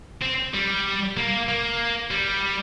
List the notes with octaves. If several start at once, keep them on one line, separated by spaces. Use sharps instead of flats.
C4
G3
A#3
A#3
G3